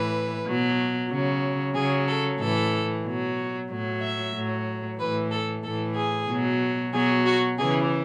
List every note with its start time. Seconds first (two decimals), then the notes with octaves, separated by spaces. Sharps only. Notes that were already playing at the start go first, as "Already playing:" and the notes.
Already playing: A2 E3 B4
0.45 B2 F#3
1.10 C#3 F#3
1.75 C#3 F#3 G#4
2.08 A4
2.39 A2 E3 A4
3.05 B2 F#3
3.70 A2 F#3
4.01 E5
4.33 A2 F#3
4.99 A2 E3 B4
5.31 A4
5.63 A2 E3 A4
5.96 G#4
6.29 B2 F#3
6.92 B2 F#3 G#4
7.26 F#4
7.58 C#3 E3 G#4